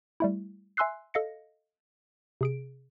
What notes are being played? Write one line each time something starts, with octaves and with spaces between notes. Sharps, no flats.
G3 A3 E4
E5 G#5 C6 E6 F#6 C7
A4 D#5 F5 A#6 C#7
C3 G#4 D7